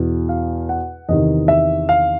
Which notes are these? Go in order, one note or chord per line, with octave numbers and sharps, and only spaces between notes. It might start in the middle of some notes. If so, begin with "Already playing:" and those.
Already playing: E2 B2
F5
F#5
E2 C3 D#3 D#5
E5
F5